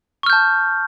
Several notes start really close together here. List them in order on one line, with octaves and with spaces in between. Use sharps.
C#6 F6 G6 A5